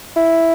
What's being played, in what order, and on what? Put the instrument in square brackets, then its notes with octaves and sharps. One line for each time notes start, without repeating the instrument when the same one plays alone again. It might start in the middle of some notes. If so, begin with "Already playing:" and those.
[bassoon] E4